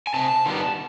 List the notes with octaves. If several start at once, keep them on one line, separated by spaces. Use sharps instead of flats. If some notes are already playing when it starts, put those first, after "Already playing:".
G#5
C3 A5
D#3 G3 B3